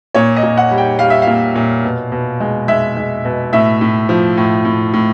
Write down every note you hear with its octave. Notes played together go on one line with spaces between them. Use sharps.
A#2 C#5
D#5
A#2
F#5
G3
G5
G3 F5
E5
A#2 F5
A#2
B2
B2
G#3
G#3 E5
G#3
B2
A2 E5
A2
F3
A2
A2
A2